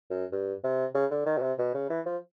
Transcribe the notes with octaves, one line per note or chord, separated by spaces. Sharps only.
F#2
G2
C3
C#3
D3
D#3
B2
C3
B2
C#3
E3
F3